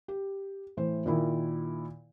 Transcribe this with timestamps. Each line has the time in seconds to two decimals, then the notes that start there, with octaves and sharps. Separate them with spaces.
0.08 G4
0.77 A2 E3 C5
1.06 A#2 D#3 E4